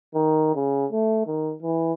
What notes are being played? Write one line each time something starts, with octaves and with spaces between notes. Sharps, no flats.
D#3
C#3
A3
D#3
E3